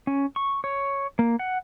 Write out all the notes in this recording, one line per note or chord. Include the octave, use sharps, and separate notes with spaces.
C#4
C#6
C#5
A#3
F#5